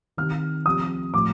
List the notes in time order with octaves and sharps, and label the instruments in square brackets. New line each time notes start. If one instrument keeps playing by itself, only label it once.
[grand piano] C3 D#3 F6
C3 F3 D#6
A2 F3 D6